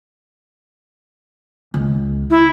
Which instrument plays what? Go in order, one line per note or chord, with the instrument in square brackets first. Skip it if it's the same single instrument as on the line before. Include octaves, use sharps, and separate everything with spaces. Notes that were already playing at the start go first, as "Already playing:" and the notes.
[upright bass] C#2
[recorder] E4